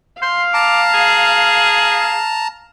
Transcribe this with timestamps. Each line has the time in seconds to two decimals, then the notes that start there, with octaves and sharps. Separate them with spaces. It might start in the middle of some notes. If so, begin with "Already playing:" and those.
0.22 F5 C6
0.54 A5 A#5 D6
0.95 G#4